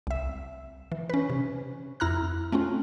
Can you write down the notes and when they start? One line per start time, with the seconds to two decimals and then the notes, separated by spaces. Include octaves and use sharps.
0.07 C2 E5
0.92 E3
1.10 C#4 B4
1.30 C3
2.00 F2 E4 A#5 F6 F#6
2.52 A3 C4 C#4 F4